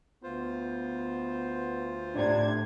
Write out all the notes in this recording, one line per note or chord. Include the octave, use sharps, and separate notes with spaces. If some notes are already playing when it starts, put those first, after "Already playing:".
D2 B3 F4 C5
A2 C3 D4 G#6